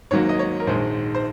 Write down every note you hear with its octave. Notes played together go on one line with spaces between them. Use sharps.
G#1 G#2 F#3 A#3 C#5
D#5
C#5
A#4
A#1 G#2 D#3 G#3 C5
C5